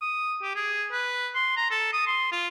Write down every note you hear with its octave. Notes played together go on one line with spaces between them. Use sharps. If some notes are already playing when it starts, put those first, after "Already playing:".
D#6
G4
G#4
B4
C6
A#5
A4
D#6
C6
F4